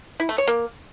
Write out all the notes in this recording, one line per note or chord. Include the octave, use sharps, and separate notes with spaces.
E4
A3
C#5
A#3